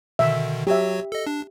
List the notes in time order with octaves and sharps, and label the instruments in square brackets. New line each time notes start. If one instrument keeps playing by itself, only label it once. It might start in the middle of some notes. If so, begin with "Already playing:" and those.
[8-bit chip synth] B2 D3 D#3 [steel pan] E5
[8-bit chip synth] F#3 F#4 C#5 [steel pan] G4 E5
[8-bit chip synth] A4 D#5
D4